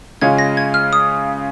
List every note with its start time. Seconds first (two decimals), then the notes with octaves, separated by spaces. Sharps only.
0.21 C#3 G#3 C#4 F4 G#6
0.39 A#6
0.57 G#6
0.74 F6
0.93 D#6